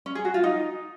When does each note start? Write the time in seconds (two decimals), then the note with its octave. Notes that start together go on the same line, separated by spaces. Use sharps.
0.06 C#4
0.15 G#4
0.25 F#4
0.34 F4
0.44 D#4